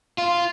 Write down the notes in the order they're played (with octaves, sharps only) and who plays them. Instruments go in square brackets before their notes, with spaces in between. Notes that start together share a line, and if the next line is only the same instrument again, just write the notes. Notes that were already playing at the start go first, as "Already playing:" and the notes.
[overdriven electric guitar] F4